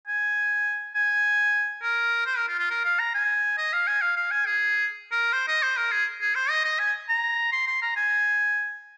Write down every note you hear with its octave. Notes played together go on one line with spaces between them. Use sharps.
G#5
G#5
A#4
C5
A#4
F4
F4
A#4
F5
A#5
G#5
D#5
F5
G#5
F5
F5
G#5
G#4
A#4
C5
D#5
C5
A#4
G#4
G#4
C5
D#5
D#5
G#5
A#5
C6
C6
A#5
G#5